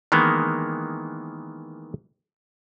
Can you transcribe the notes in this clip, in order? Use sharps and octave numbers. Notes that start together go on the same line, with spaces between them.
D#3 E3 G#3 A#3 B3